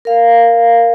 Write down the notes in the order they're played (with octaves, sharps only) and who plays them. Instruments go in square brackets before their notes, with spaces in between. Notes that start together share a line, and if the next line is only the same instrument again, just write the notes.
[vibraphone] A#4 F5